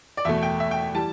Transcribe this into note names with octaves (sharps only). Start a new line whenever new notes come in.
D5
E2 B2 A3 E5
G5
E5
G5
E3 G3 A5